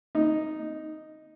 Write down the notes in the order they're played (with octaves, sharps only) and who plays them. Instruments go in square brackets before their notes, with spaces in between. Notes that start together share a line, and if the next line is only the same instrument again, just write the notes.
[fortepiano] D#4